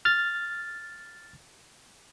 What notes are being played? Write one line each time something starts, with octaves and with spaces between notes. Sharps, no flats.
F6 A6